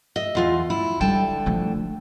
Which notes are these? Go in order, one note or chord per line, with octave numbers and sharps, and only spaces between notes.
D#5 E5
E2 F4 F5
E4
D3 G3 G5 A5
F3 A3